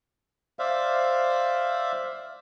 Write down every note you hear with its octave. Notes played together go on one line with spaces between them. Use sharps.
C5 D5 E5 F5